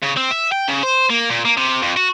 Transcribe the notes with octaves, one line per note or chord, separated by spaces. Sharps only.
C#3
C4
E5
G5
C#3
C5
A#3
A#2
A#3
C3
F2
F#4